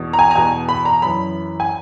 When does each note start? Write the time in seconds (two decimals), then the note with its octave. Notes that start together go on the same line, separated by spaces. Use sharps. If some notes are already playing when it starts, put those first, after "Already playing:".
Already playing: E2 B2
0.13 A#5
0.19 G#5
0.31 A#5
0.35 E2 B2 G#5
0.69 B5
0.85 A#5
1.02 F#2 E3 B5
1.60 G#5